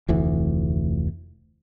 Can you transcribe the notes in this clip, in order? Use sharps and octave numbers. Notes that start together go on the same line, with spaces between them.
F1 D2 E3